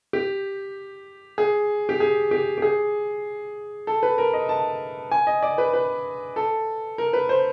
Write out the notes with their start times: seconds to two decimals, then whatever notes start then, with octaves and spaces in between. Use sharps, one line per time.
0.13 G4
1.38 G#4
1.89 G4
2.00 G#4
2.31 G4
2.58 G4
2.62 G#4
3.87 A4
4.03 B4
4.18 A#4
4.33 D#5
4.49 A5
5.12 G#5
5.27 D#5
5.43 D5
5.58 B4
5.74 B4
6.36 A4
6.98 A#4
7.13 B4
7.29 C5